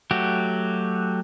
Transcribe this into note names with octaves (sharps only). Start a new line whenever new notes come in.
F#3 A3 F#4 G4